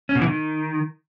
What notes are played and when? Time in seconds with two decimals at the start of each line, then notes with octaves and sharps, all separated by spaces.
0.09 C#4
0.15 B2
0.21 E3
0.27 D#3